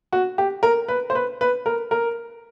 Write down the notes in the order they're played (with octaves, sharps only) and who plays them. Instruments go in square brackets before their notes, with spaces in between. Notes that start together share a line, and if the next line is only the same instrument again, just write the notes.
[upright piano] F#4
G4
A#4
B4
C5
B4
B4
A#4
A#4